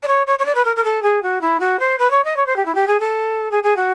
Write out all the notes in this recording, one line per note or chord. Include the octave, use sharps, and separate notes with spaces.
D5
C#5
C#5
C#5
D5
B4
A#4
A#4
A4
G#4
F#4
E4
F#4
C5
B4
C#5
D#5
C#5
C5
G4
E4
G4
G#4
A4
G#4
G#4
F#4